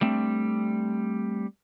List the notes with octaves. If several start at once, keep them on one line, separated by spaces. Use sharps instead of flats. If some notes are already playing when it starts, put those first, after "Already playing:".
G3 A3 C4 D4